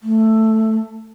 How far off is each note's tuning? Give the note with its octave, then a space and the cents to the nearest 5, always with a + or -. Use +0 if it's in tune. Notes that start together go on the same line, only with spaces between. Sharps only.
A3 +5